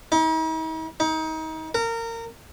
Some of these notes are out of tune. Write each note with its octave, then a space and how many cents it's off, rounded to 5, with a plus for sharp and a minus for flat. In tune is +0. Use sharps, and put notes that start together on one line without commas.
D#4 +45
D#4 +30
A#4 -25